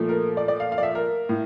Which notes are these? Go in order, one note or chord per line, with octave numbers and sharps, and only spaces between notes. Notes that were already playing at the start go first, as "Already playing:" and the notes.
Already playing: A#2 F3 A3
A#4
D5
D5
F5
F5
D5
E5
A#4
A2